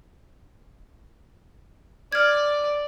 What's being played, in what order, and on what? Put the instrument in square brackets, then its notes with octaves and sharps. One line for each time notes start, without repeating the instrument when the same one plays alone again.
[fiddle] D5 [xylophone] F6 G#6